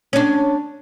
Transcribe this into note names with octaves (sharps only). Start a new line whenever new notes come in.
C#4 D4